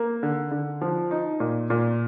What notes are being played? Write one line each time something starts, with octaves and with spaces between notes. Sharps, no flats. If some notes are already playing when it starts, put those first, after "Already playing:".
Already playing: A#3
D3
D3
F3
D#4
A#2
A#2